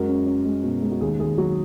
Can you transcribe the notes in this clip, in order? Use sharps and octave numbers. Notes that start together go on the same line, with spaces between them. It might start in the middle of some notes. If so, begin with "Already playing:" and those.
Already playing: F#2 G#3 F#4 A#4
C#4
C#4
G#3
B2
G#3
F#4
D#2 G#4
D#2 G#4
F#3 F#4